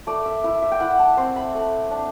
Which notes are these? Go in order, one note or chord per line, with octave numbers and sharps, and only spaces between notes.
A3 D5
E5
E4 E5
E5
G5
E4 F#5
A5
C4 C6
B5
A3
D4